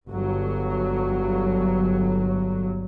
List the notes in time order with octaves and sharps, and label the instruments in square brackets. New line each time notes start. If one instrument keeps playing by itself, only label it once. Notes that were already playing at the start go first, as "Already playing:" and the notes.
[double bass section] G1 F#3